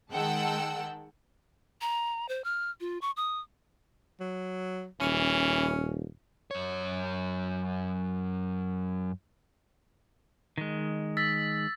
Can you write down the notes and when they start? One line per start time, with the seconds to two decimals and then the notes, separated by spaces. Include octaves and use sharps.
0.12 D#3 G#3 F#5 G5 A5 E6
1.81 A#5
2.29 C5
2.44 F6
2.81 F4
3.02 C#6
3.17 D#6
4.20 F#3
5.01 D#1 E3 C#4
6.51 F#2 C#5
10.58 D#3 G#3
11.17 E6 A6 B6